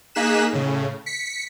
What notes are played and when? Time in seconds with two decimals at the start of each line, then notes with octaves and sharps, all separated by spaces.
0.15 A#3 D#4 G#4 F#6 B6 E7
0.53 A2 C#3
1.06 B6 C#7